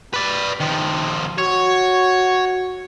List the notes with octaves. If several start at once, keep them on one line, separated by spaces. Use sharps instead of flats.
B4 D5
D#3 F3
F#4 C#5